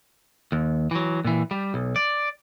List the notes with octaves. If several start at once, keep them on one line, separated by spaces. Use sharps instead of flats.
D#2
E3 F#3
A#2 E3
G3
B1
D5